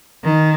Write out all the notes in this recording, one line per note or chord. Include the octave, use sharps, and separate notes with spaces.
D#3